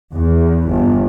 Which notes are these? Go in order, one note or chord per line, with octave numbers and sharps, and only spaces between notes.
E2
G1